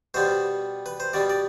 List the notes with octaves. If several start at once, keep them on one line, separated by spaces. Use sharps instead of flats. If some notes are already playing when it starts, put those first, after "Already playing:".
B2 G3 B3 C5
B4
C5
B2 G3 B3 D5
D5